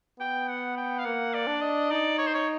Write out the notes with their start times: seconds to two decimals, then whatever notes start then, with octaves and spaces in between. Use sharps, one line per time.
0.20 B3 G5
0.48 F#5
0.77 G5
0.98 F5
1.05 A#3 F#5
1.34 D5
1.47 D4
1.62 D#5
1.91 D#4 D5
2.18 C#5
2.27 C5
2.34 C#5